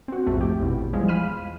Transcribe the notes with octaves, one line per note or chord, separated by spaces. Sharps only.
C4 F#4
A#1 F2 G#2 A3
G4
A1 E2 B2
E2 F3 G3 G#3
F5 B5 F6 D#7